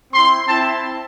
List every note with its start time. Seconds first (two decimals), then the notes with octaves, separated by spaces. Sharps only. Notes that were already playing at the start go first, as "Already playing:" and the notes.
0.13 C4 E4 C6
0.48 C4 E4 A5